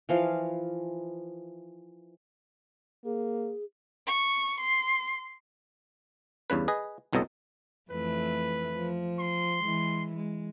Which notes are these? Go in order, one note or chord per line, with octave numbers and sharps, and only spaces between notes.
E3 F3 F5
A#3 G#4
C#6
C6
E2 G2 C#3 B4
G#4 B4 D#5
G1 C2 B2 F#3 A4 D#5
F2 E3 A3 B4
F3
C6
E3 G#3
G#3